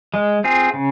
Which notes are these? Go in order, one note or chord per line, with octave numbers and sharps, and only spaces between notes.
G#3
C4 F4 G#4
C#3